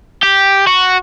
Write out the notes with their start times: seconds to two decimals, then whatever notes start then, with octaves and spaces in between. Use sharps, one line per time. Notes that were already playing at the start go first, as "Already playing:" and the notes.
0.23 G4
0.67 F#4